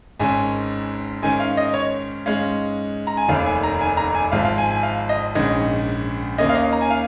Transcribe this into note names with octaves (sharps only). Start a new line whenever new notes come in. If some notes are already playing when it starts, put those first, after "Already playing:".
G#1 G#2 D#3 C#4 G#5
G#2 D#3 C#4 G#5
F5
D#5
C#5
G#2 G#3 C#4 F5
A#5
G#5
F1 D#2 D#3 F5
G#5
A#5
G#5
A#5
G#5
G#1 G#2 F3 F5
F5
G#5
G#5
F5
D#5
A#1 G#2 D#3 C#4 D#5
D#2 D#3 A#3 C#4 D#5
F5
D#5
A#5
G#5
F5